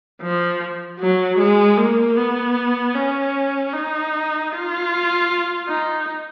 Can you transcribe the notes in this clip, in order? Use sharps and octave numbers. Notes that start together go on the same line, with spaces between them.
F3
F#3
G#3
A#3
B3
C#4
D#4
F4
D#4